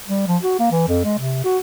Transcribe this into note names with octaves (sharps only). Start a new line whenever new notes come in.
G3
F3
F#4
A#3
E3
F2
G#3
C3
F#4